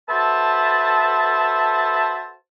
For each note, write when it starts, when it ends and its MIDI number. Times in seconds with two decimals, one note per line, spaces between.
0.09 2.33 66
0.09 2.33 69
0.09 2.33 71
0.09 2.33 72
0.09 2.33 76
0.09 2.33 81